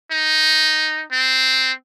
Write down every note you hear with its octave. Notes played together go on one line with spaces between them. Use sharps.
D#4
C4